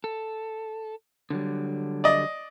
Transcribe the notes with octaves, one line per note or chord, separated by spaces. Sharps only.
A4
D3 F#3 G3
D5 D#5